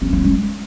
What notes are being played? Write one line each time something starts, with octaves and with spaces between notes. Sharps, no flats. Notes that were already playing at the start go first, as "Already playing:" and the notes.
C#4
C#4
G#3